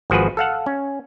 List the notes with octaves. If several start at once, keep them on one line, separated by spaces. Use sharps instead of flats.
G#1 F3 F#4 G#4 B4
A4 F5 F#5
C#4